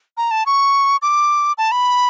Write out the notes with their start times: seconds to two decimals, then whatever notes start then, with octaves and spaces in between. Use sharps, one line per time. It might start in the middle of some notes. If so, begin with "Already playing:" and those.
0.17 A#5
0.31 A5
0.46 C#6
1.02 D6
1.58 A5
1.72 B5